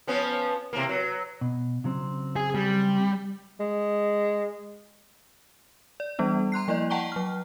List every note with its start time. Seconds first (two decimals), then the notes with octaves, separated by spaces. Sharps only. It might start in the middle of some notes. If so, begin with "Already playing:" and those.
0.07 F3 B3 C#4
0.73 C3 E3 A#3
0.89 F#3
1.41 B2
1.84 C#3 F#3 C4
2.36 G#4
2.55 G3
3.60 G#3
6.00 D5
6.19 E3 G3 B3 D4
6.52 A#5 C6 F#6 C7
6.68 F3 A#3 E4 D5 D#5
6.90 F#5 G5 A5 A#5 C#6 G7
7.12 F#3 F6